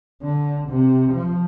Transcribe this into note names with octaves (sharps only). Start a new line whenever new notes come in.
D3
C3
F3